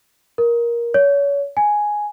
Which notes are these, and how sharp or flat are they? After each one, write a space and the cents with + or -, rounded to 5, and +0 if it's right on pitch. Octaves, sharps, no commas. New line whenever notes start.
A#4 +15
C#5 +30
G#5 +5